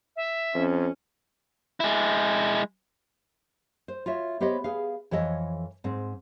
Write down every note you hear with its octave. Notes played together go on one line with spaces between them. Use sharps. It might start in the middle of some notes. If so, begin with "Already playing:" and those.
E5
F2 C#4
G#3 E4
C5
F4 F#4 C#5 E5
B3 G4 C5 C#5 D#5
B3 G#4 F5
F2 E3 A4 C#5 D#5
G#2 C4